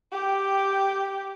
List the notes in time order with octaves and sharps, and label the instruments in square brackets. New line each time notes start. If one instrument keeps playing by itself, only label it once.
[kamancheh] G4 G5